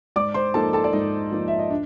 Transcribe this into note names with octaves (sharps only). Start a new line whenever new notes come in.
G#2 D5 D6
C5 C6
F3 A#3 D#4 A4 A5
A4 A5
D5
G#2 D#4 D#5
F3 A#3 D#4
E5
D#5
D4